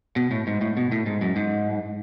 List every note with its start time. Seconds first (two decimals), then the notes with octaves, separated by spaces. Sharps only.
0.16 B2
0.31 A2
0.47 G#2
0.61 A2
0.77 B2
0.92 A2
1.06 G#2
1.21 F#2
1.36 G#2